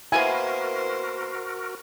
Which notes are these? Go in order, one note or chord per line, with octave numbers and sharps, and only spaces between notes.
A#3 B3 E4 F#4 A#4 C5 G#5